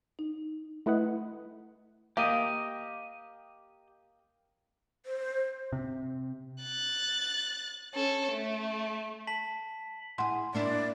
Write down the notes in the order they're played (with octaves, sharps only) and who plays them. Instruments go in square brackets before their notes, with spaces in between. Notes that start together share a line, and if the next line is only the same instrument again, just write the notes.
[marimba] D#4
[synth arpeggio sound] A3 E4 B4 D#5 F#5
[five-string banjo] A#3 [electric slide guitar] G4 D#5
[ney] C5
[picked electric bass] C3
[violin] F#6 A6
C#4 A4
A3
[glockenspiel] A5 B6 F#7
[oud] E4 G#4 [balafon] F#5 C6
[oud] A#3 D4 E4 [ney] D5